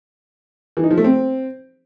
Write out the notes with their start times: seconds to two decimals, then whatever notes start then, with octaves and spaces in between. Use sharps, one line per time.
0.77 E3
0.84 D#4
0.91 F3
0.97 A3
1.04 C4